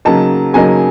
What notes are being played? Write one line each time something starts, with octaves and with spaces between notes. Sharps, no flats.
C#3 F#3 A#3 D#4 A5
C#3 F#3 A#3 D#4 G#5